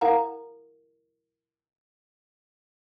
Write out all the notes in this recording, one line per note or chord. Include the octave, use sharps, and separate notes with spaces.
E4 A#4 F5 F#5 A#5